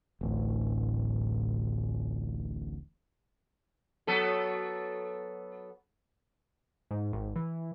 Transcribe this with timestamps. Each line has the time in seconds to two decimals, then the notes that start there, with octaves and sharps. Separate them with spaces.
0.21 D1 A1
4.07 F#3 B3 A4
6.91 G#2
7.13 G#1
7.36 E3